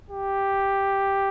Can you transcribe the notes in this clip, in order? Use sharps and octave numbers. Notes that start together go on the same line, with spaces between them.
G4